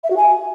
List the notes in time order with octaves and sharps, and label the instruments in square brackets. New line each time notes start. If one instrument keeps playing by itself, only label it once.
[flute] E5
F#4
G#5